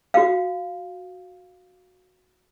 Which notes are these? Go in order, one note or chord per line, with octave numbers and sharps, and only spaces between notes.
F#4 F5